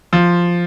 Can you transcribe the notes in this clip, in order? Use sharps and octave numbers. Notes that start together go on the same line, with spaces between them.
F3